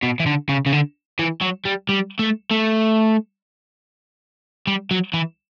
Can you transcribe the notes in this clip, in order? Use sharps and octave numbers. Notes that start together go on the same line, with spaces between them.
B2
E3
D3
C#3
C#3
D3
E3
F#3
G3
G3
A3
A3
G3
F#3
E3